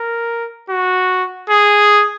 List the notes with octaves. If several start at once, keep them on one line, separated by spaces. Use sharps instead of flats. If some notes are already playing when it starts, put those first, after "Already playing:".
Already playing: A#4
F#4
G#4